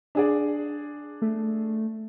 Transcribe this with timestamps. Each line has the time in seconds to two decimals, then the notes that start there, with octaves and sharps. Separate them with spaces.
0.15 D4 G#4 D5
1.22 A3